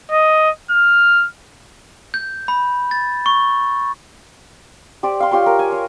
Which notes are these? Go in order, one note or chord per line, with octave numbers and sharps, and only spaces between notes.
D#5
F6
G6
B5
A6
C#6
G4 C5 D5
F5 C6
F4 G4 C#5 C6
A#4
G#5
C#5